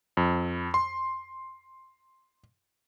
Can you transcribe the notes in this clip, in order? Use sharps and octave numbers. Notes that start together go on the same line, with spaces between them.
F2
C6